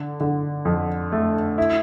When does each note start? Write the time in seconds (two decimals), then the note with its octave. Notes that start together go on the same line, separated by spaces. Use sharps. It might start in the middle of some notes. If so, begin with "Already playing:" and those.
Already playing: D3
0.20 D3
0.65 F2
1.12 A3
1.58 E4